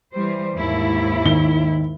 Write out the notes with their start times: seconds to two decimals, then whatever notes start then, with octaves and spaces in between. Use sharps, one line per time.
0.14 E3 G3 C5
0.57 D#2 G#2 E4
1.25 D#3 G7